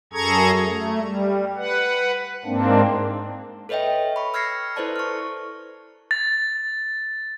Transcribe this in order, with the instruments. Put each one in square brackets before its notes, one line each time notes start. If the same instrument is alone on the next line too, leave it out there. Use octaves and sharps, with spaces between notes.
[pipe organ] F#2 G#4 A4 A#5 C#6 G#6
A3
G3
B4 F#5
G#2 A#3 C4 D4
[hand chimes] A4 B4 C#5 D#5 E5 G5
B5 C#6
E6 F6 G#6 A#6 C7 C#7
E4 A4 B4 C5 D5 A5
C#6 F6
[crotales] A6